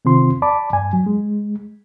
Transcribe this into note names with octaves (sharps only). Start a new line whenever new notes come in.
C3 D#3 C4 F4 C6
D5 A5 B5 D6
G2 G#5
F#3
G#3